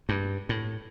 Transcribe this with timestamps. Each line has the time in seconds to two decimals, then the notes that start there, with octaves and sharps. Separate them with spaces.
0.09 G2
0.49 A2